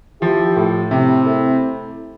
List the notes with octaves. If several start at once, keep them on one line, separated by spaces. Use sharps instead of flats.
F3 E4 G4
A2
C3 C4 E4
A3